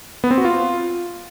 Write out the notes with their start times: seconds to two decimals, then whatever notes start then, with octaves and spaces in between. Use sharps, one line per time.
0.24 B3
0.31 C4
0.38 F#4
0.45 F4